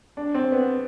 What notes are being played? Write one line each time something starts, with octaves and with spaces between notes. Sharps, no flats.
D4
C4
B3